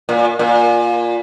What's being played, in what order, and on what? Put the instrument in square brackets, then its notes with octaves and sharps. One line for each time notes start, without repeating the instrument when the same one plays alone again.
[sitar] A#2
A#2